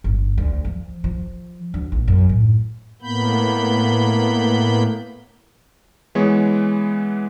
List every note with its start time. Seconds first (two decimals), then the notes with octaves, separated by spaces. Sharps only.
0.04 G1
0.38 D2
0.64 F3
1.04 F3
1.74 D2
1.92 A#1
2.08 F#2
2.29 A2
3.02 A2 A#3 B3 B5 G6
6.15 E3 G#3 B3 C#5